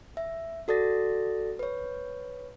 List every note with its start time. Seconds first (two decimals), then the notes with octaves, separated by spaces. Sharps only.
0.17 E5
0.68 F#4 A4 D5 A6 A#6
1.59 B4 C#5